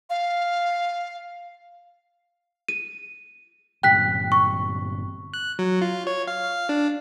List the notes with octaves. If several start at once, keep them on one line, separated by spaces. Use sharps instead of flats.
F5
D#7
G1 A#2 G5 F#6 B6
C#6
F#6
F#3
F4
C#5
F5
F5
D4